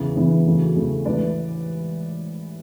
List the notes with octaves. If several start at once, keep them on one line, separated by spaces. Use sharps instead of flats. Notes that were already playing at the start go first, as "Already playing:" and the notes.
Already playing: E2 C#3 E3 B3
E2 C#3 E3 B3
E2 C#3 F#3 A3
E2 C#3 F#3 A3
A1 G#2 E3 B4 D5